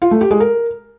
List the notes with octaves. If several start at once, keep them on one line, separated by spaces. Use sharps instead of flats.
F4
A3
G4
G#3
A#4